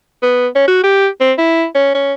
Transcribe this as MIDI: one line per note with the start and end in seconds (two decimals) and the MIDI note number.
0.23 0.47 59
0.56 0.66 61
0.68 0.81 66
0.84 1.07 67
1.20 1.32 60
1.38 1.65 64
1.75 1.95 61
1.95 2.14 61